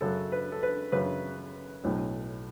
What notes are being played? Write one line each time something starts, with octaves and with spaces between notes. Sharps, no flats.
F#2 C#3 F#3 A4
B4
A4
B4
F#2 C#3 F#3 B4
B1 A2 F#3